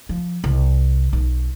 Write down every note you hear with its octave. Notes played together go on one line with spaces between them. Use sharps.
F3
C2
B1